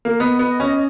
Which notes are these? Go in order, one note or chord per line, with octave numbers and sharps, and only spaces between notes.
A#3
B3 D#5
B3
C#4